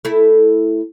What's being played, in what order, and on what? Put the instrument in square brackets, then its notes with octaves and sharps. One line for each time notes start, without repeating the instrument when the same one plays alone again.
[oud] A3 E4